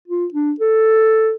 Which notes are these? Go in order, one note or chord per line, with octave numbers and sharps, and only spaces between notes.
F4
D4
A4